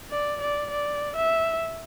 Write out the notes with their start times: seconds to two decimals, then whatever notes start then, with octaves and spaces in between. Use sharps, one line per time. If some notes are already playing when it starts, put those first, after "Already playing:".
0.11 D5
0.41 D5
0.71 D5
1.16 E5